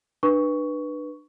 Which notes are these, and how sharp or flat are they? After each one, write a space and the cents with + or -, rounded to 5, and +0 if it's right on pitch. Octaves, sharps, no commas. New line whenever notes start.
D4 +30 B4 -10 C#6 +10